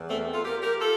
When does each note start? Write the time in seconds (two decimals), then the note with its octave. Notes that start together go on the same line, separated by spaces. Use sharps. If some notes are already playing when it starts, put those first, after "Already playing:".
Already playing: E2 E3
0.10 A3 C4
0.33 F4 A4
0.45 G4 A#4
0.63 G4 A#4
0.80 F4 A4